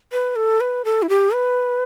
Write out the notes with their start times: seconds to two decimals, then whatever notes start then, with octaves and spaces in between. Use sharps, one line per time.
0.12 B4
0.36 A4
0.60 B4
0.85 A4
1.02 E4
1.09 G4
1.34 B4